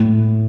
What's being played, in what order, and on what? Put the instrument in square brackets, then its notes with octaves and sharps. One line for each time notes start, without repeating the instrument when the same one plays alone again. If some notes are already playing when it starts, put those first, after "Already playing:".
Already playing: [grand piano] A2